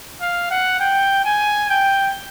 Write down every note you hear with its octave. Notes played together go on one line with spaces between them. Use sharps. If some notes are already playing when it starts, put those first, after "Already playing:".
F5
F#5
G5
G#5
G5